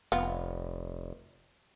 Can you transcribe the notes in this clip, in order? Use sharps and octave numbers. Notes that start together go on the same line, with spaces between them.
F1 B3 F4